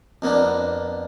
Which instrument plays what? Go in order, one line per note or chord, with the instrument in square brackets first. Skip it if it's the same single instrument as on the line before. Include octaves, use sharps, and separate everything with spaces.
[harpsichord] F2 A#3 B3 D4